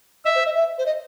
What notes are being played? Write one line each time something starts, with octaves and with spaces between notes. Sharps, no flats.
D#5 E5
C5
D#5
E5
C5
D#5